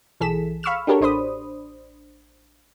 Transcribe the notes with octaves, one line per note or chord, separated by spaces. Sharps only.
B1 E3 G#4 A4 B6 E7
F5 B5 C#6 E6 F6 E7
D4 F#4 G4 A4 A#4 C#5
A1 D4 C5 D5 B5 D#6